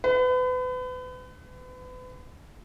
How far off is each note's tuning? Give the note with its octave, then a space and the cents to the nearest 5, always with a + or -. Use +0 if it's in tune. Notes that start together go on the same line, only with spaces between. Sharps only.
B4 +35